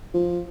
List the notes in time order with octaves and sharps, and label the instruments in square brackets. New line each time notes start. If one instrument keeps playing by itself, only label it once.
[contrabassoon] F3